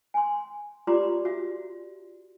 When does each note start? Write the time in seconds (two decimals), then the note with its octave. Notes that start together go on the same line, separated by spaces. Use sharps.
0.14 G#5 C6
0.87 F4 G4 D5 A#5 C6 D6
1.25 F#4 E5